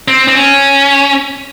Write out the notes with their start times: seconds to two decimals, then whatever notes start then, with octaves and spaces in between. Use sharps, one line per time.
0.08 C4
0.28 C4
0.35 C#4